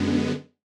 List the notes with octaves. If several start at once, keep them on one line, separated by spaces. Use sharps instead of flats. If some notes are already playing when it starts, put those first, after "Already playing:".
Already playing: F#2 D3 G#3 B3